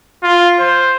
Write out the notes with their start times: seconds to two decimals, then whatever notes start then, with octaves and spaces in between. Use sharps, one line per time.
0.23 F4
0.59 C5